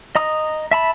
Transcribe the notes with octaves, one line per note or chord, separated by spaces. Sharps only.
D#5 A#5 D#6
E5 A5 B5